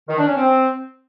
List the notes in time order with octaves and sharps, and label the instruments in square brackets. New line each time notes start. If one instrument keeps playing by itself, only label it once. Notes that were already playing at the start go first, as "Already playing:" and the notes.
[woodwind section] D#3
D4
C#4
C4